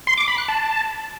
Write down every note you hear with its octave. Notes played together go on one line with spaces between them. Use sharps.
C6
D6
B5
F#6
A5